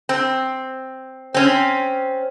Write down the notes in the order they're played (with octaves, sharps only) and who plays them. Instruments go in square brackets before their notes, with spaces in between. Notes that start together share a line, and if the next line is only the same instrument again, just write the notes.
[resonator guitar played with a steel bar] C4
C4 C#4